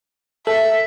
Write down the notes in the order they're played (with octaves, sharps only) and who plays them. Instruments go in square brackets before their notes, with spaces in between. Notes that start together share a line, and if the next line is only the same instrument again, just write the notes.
[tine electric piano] A4 [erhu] E5